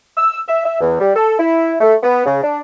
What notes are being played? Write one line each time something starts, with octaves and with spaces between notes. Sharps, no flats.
E6
E5
E5
E2
G3
A4
E4
A3
B3
C#3
D4